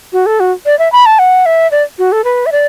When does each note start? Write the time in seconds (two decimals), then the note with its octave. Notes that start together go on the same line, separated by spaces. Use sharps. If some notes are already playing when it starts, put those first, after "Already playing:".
0.13 F#4
0.26 A4
0.40 F#4
0.66 D5
0.79 E5
0.92 B5
1.06 A5
1.19 F#5
1.46 E5
1.71 D5
1.99 F#4
2.12 A4
2.24 B4
2.46 E5
2.52 D5